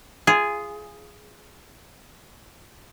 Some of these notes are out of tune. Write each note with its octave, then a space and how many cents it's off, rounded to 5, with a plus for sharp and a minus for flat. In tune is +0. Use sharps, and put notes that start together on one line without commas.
F4 -20 G#4 +0